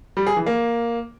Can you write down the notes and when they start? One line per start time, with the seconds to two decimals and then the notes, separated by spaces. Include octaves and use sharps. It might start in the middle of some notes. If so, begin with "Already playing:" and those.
0.17 G3
0.27 G#4
0.37 E3
0.46 A#3